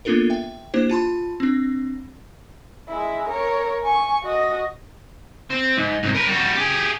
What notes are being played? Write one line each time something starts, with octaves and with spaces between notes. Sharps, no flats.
A#3 B3 D4 F4 A4 A#4
E5 G5
A#3 D4 E4 G4 C5
F4 A5 B5 C6
C4 D4
G#3 E4
A#4 C#5
G#5 C#6
F#4 D#5
C4
G#2
C2 G#2
A#4 B4
G3 F#4
G4 G#4